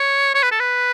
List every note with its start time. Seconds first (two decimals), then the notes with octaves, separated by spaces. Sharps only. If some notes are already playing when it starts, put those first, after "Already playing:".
Already playing: C#5
0.34 C#5
0.43 B4
0.51 A4
0.60 B4